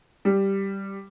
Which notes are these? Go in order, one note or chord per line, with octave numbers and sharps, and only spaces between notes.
G3